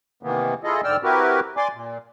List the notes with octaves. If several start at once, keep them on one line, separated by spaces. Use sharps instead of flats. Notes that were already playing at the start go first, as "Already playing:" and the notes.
C3 D#3 E3 A#3 B3
E4 F4 G#4 A4 D#5
G#2 D3 D5 G5 E6 F6
C4 E4 F#4 G4 A#4 B4
D5 G#5 C6 D6
A#2